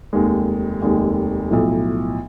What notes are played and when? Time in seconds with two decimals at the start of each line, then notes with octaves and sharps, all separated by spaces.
0.13 F1 D#2 D#3 G#3
0.82 F1 D#2 D#3 G#3
1.51 B1 A2 F3